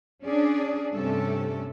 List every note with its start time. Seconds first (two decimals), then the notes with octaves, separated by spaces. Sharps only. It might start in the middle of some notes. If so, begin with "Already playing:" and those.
0.24 C#4 D4 G#4 D5
0.93 G2 C3 A3 C#4 A4